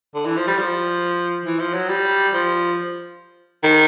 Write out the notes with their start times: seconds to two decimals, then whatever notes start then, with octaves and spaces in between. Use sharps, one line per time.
0.15 D3
0.25 E3
0.37 F3
0.47 G3
0.58 F3
1.45 E3
1.60 F3
1.74 F#3
1.89 G3
2.33 F3
3.63 D#3